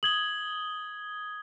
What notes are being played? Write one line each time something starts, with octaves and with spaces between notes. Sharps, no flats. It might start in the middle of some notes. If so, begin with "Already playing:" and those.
D#6 G#6 F#7 G7